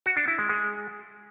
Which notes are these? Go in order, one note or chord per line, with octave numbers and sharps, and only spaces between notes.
F#4
D4
E4
G#3
G#3